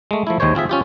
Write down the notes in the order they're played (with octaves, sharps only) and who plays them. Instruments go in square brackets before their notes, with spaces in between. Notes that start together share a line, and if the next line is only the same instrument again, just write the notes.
[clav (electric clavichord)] G#3 A3
F3 A3 E4
D#2 D#3 G#3 C5 C#5
C4 F4 G#4 E5
C#4 F4 G4